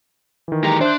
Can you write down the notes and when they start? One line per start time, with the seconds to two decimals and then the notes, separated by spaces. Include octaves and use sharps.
0.48 D#3 E3
0.64 G#3 G4 A#5
0.81 D4 C5 E5 F#6